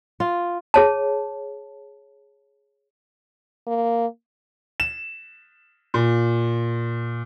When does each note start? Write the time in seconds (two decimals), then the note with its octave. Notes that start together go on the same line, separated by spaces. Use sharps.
0.20 F4
0.74 G#4 C#5 A5
3.67 A#3
4.80 E7
5.94 A#2